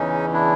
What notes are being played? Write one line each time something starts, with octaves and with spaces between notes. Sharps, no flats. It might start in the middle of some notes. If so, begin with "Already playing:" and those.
Already playing: E2 C#3 E3 C#4 D#4
D4 E4